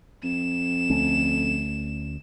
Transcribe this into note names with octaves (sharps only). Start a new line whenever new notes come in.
F2 E7
D2 A3 C#4